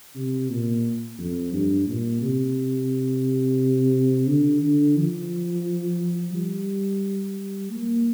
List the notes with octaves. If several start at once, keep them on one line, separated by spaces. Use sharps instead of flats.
C3
A#2
F2
G2
A#2
C3
D3
D3
F3
G3
A#3